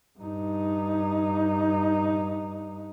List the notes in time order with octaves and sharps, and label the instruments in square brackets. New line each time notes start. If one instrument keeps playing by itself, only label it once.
[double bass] G2 D#4